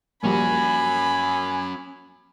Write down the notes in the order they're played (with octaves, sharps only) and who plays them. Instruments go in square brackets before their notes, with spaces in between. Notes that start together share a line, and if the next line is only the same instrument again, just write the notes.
[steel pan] F3 G3 A#3 [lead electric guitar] C#4 F#4 [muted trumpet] G#5 [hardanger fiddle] B5